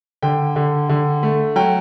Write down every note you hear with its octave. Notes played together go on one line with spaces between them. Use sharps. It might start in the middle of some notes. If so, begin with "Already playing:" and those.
D3 G5
D3
D3
A3
F#3 G5